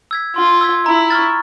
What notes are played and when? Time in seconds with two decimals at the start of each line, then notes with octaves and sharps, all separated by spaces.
0.11 E6 G#6 B6
0.36 F4 C6
0.61 E6 G#6 B6
0.86 E4 A#5
1.10 C#6 F6 A6